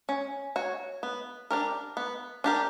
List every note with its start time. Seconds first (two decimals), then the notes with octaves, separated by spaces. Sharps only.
0.09 C#4
0.56 F#4 C#5
1.03 B3
1.50 D4 G4 A#4
1.97 B3
2.44 D4 G4 A#4